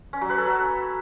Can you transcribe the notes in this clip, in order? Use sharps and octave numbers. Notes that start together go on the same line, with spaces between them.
C#4
F#3
B4
A4
F#3